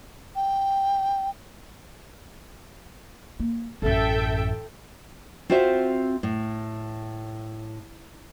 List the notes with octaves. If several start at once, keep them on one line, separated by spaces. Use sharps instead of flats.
G5
A#3
A1 F#2 A4 E5 G5
C4 F4 F#4 C5 E5
A2